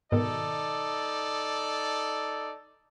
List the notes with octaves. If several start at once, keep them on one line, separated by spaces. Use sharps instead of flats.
G#2 B2 D#3 D#4 A4 D5